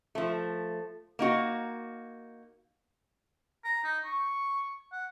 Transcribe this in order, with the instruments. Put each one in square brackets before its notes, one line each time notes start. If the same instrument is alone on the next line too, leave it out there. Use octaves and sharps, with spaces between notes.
[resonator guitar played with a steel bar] F3 A3
A#3 D#4 F#4
[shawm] A#5
D#4
C#6
F#5